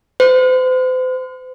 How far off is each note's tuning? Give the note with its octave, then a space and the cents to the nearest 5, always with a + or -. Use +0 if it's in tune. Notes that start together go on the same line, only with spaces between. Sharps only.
C5 -40